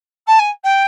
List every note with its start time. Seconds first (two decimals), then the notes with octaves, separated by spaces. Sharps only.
0.27 A5
0.39 G#5
0.63 G5